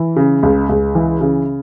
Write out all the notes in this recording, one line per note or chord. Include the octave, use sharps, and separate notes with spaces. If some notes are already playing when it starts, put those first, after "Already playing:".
Already playing: E3
C#3
C#2
C#2
E3
C#3